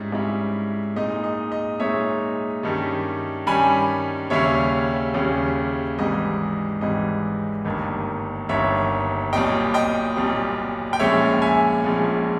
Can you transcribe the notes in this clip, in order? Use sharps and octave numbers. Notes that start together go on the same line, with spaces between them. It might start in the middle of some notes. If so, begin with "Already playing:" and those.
Already playing: G#2 G3 C#4 E4
G#2 G3 C#4 E4
A#2 G#3 D#4 D#5
D#5
D#5
A#2 G#3 D#4 C#5 E5
G2 D#3 G3 C#4
G2 D#3 G3 C#4 G#5 B5
D#2 C#3 G3 C#4 C#5 E5
D#2 C#3 G3 C#4
G#1 G#2 E3 G3 D#5
G#1 G#2 E3 G3 D#5
G1 G2 D#3 A#3
G1 G2 D#3 A#3 C#5 E5
B1 A#2 G3 D#5 G5
D#5 G5
B1 A#2 G3
G5
A#1 A#2 G#3 C#4 C#5 E5
E5 G#5
A#1 A#2 G#3 C#4